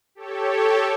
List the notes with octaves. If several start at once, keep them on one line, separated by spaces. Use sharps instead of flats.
G4 A4 C#5